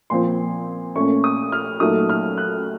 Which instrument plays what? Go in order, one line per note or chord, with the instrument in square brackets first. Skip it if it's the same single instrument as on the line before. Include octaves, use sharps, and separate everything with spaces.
[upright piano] A#2 F3 C4 C6
A#2 A3 C#4 C#6
D#6
F6
A#2 F#3 A3 D#4 D#6
F6
F#6